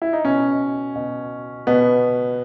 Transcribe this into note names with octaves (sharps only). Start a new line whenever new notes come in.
E4
D#4
B2 C#4
B2
B2 B3